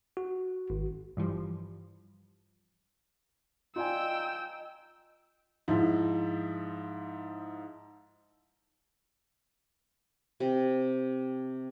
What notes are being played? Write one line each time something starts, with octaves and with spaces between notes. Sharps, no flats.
F#4
G#1
G2 E3 F3 G3
D#4 F4 C5 D5 D#5 G5 G#5 E6
G#2 F3 E4
C3